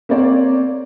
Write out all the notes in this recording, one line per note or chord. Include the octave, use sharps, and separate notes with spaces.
A#3 C4 C#5 D5